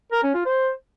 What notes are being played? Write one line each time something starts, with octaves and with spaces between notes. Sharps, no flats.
A#4
C#4
F4
C5